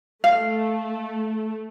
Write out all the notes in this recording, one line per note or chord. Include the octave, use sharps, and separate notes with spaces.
A3 F5